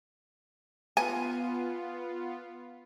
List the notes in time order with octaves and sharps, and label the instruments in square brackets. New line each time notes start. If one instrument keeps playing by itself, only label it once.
[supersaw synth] B3 F4 [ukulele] G#5